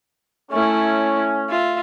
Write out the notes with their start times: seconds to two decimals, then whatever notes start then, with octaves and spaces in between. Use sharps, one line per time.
0.51 A3 C#4 E4
1.49 F4 E5